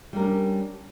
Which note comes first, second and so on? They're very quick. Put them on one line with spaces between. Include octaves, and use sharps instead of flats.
G3 A#4 D4 C#4